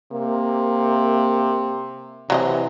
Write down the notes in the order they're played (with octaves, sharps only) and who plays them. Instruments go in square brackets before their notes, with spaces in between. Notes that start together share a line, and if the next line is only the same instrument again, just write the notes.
[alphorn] C3 [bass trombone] A#3
[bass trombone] C3 [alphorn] E3 [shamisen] F#3 F4 D#5